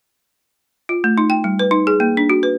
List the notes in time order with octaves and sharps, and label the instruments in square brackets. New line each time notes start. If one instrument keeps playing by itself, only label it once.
[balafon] F4
A3
D#4
G5
G3
B4
D#4
G#4
A#3
D4
F#4
B4